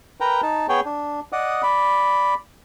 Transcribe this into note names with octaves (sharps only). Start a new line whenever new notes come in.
A#4 B4 G5 A#5
D#4 A5
B3 G#4 C#5 G5
D4
D5 D#5 F#5 D#6
D5 B5